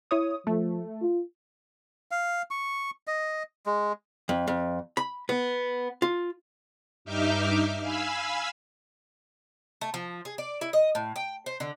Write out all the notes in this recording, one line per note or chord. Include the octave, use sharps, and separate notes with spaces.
E4 C#5 D#6
F3 A3
F4
F5
C#6
D#5
G#3
F2
F2
B5
B3
F4
G2 D#4 E5 D6 F6 G6
F5 G#5 B5 E6
A3
F3
G#4
D5
E4
D#5
A2
G5
C5
D3